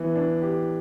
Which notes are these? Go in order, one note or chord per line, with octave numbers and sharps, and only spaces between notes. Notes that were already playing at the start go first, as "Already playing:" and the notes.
Already playing: E3 B3
D4
G4